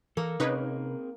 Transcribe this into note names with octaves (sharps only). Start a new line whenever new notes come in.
E3 A#3 A4 A#4
C3 C4 C#4 D#4 G#4 A#4 B4 C#5